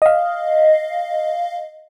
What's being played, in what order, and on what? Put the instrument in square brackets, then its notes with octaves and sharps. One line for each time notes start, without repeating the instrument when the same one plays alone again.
[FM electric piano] D#5 F5